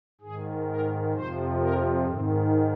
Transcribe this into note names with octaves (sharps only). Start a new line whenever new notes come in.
G#2 D#3 G#4
A#4
F2 C3 F3 C5
A#4
G#2 D#3 C4